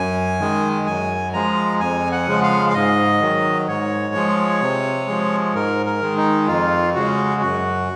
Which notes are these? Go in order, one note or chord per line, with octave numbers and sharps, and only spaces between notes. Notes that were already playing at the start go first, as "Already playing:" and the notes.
Already playing: F#2 G#5
D#3 G#3
F#2 G#5
F3 G#3 A#5
F2 G#5
F#5
C#3 F3 G#3
F5
F5
G#2 D#5
D#3 F#3
G#2 C#5
F3 G#3
C3
F3 G#3
G#2 A#4
A#4
D#3 G#3
D#4
F2 F4
C#3 G#3 F#4
F#2 F#4